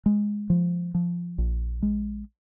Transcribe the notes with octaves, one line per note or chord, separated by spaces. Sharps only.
G#3
F3
F3
A#1
G#3